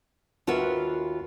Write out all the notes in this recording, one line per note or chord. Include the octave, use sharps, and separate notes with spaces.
D#2 F4 F#4 B4 E5